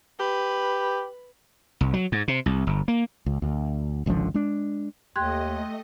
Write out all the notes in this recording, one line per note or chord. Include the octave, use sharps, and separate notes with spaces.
G4 B4
C2
F#3
G#2
C3
C2
G1
A#3
C#2
D2
G#1 C#2 D3 F3
G#3 D4
D#2 A3 G4 D#5 C6 F#6 G#6